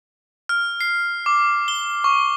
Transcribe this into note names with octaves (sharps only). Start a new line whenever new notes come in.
F6
C7
D6
G7
C#6